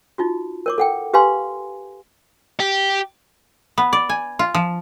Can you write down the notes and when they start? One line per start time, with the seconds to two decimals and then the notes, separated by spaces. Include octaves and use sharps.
0.18 D#4 F4 F#4
0.66 A#4 C#5 D6
0.78 A4 F#5 G5
1.13 G4 B4 F5 G#5 C6
2.60 G4
3.78 B3
3.93 D5
4.09 G#5
4.39 F4
4.55 F3